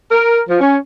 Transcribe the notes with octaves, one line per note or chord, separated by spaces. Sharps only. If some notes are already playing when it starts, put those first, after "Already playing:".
A#4
F3
C#4